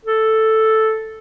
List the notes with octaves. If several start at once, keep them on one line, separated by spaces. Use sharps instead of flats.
A4